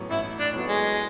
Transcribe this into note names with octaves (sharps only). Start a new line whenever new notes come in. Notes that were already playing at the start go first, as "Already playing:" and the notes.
Already playing: A1 A2 F#3 B3
A1 E4
D4
A2 F#3 B3
G#3